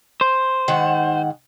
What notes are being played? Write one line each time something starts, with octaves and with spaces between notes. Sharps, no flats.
C5
G#2 D#3 F#5